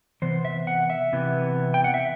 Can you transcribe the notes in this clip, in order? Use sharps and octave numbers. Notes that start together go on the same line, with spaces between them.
C3 E3 B3 C5
E5
F#5
E5
C3 E3 B3
G5
F#5
E5